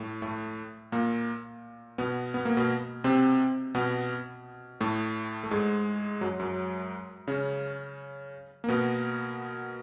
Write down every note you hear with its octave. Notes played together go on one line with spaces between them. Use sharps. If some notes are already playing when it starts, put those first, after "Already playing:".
Already playing: A2 A3
A2 A3
A#2 A#3
B2 B3
B3
A#3
B2 B3
C3 C4
B2 B3
A2 A3
A3
G#2 G#3
F#2 F#3
F#2 F#3
C#3 C#4
A#3
B2 B3